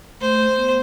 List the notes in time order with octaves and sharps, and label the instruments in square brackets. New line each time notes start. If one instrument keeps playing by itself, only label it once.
[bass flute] A3 [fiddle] C5
[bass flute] B3